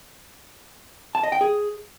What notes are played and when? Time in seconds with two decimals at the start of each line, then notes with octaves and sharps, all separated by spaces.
1.15 A5
1.23 D#5
1.32 G5
1.41 G#4